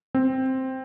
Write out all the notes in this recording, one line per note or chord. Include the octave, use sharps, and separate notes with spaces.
C4